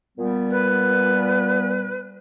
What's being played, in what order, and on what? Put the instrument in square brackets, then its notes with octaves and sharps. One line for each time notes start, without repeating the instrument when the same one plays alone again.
[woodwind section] A#2 G3 B3
[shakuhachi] B4